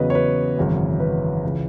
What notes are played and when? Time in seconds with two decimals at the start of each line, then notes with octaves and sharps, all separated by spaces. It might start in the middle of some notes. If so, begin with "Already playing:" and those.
Already playing: E2 C#3 F#3 B4 D#5
0.10 C#5
0.15 B4
0.57 G#1 F#2 C#3 E3
1.00 B4
1.43 C#2 C#3 E3